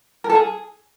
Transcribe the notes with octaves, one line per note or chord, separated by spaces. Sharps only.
A#4
A4
G#4